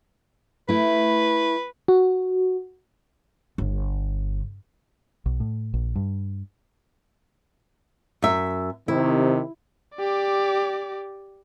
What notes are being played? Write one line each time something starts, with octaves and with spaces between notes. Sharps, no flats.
A3 E4 B4
F#4
G1
B1
A2
A#1
G2
F#2 E5
C3 D#3 E4
G4 D5